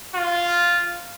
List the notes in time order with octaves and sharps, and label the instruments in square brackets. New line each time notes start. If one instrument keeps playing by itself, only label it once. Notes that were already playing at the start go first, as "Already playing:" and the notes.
[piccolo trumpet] F4